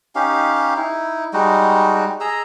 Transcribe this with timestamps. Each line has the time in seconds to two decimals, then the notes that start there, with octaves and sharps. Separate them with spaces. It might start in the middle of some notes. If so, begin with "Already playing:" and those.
0.15 C#4 D#4 G4 F5
0.76 D#4 E4
1.33 G3 G#3 D#4 F#4
2.20 G#4 D#5 A#5 E6